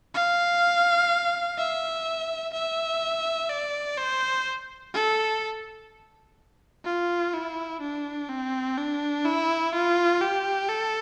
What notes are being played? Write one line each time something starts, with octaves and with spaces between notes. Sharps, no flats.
F5
E5
E5
D5
C5
A4
F4
E4
D4
C4
D4
E4
F4
G4
A4